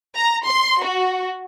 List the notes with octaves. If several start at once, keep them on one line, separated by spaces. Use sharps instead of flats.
A#5
C6
F#4